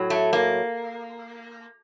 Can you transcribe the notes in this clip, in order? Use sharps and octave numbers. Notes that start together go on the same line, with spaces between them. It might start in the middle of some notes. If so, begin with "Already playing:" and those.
Already playing: A2 F#3
A3
A#3